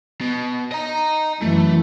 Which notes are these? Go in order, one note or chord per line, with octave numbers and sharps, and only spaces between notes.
B2
D#5 A#5
F#2 E3 A3